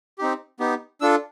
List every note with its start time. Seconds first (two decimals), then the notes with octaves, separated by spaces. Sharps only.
0.18 C4 D#4 G4
0.60 B3 D#4 G4
1.01 D4 F4 A4 E6